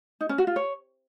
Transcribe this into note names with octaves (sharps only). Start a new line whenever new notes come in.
D#4
C#4
F#4
F4
C#5